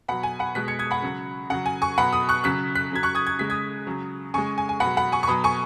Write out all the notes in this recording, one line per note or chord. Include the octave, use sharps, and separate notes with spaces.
B2 F#3 F#5 B5
G#5
F#5 B5
B2 G#3 F#6 B6
G#6 C#7
D#6 G#6
F#5 B5
C#3 F#3
C#3 F#3 F#5
G#5
G#5 C#6
B2 F#3 F#5 B5
B5 D#6
C#6 F#6
C#3 F#3 F#6 B6
F#6 B6
C#3 F#3 G#6
C#6 F#6
D#6 G#6
G#6
C#3 G#3 B6
D#6 G#6
C#3 F#3
C#3 G#3 G#5 C#6
G#5
G#5
B2 F#5 B5
F#3
F#5 B5
G#5 C#6
C#6
B2 F#3 B5 D#6
G#5 C#6